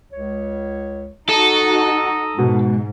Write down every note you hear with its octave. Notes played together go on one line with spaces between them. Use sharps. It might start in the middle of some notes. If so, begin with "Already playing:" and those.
C#2 C#5
D#4 F#4 A4 A#5 D#6
G#2 B2